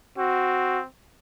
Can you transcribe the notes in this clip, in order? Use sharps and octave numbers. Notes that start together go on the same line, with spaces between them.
C4 F#4